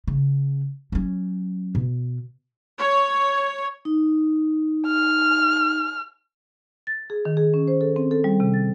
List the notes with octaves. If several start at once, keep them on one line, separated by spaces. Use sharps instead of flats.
C#3
F#3 C#4
B2
C#5
D#4
F6
A6
G#4
D#3
G#4
C#4
C5
A4
C4
A4
G3
C3
A6